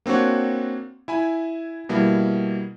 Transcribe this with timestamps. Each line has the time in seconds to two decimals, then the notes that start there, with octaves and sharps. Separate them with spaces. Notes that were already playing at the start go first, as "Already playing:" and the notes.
0.06 A#3 C4 D4 F#4 C#5
1.08 E4 G#5 B5
1.89 B2 G3 A#3 E4